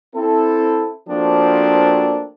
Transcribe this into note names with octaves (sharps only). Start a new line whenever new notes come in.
C4 E4 A4
F3 A3 A#3 C4 D4 F#4